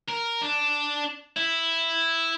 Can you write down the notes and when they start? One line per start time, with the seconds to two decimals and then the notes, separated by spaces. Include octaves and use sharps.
0.08 A#4
0.41 D4
1.37 E4